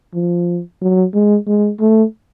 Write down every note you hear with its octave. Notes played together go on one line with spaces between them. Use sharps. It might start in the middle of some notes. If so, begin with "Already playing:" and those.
F3
F#3
G#3
G#3
A3